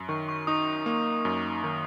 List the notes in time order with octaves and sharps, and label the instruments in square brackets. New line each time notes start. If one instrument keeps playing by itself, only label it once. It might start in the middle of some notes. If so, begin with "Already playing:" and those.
Already playing: [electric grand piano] F#2
[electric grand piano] D#3 [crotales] C#6
[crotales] C#6
[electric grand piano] D#4 [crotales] D#6
[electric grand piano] A#3
F#2
D#3